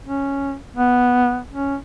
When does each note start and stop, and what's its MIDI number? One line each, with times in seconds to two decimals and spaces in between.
0.05 0.55 61
0.76 1.39 59
1.50 1.76 61